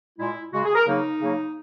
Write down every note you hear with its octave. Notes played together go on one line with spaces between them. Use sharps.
A#2 G#3 E4
C#3 G#3 F#4
G#4
A#4
C#3 F#3 A#3 D#4
C#3 F#3 A#3